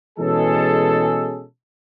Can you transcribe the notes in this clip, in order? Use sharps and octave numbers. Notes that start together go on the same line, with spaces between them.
B2 E3 G#3 C#4 G#4 A4